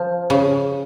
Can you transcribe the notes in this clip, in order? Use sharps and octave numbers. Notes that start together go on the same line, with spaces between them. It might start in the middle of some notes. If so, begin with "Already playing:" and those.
Already playing: F3
C#3